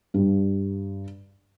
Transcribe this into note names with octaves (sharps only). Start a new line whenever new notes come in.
G2